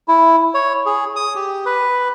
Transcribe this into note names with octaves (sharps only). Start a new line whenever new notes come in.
E4
C#5
G#4
D#6
G4
B4